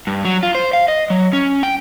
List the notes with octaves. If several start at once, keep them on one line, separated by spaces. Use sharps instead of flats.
G2
F#3
F4
C5
F5
D#5
F#3
C#4
G5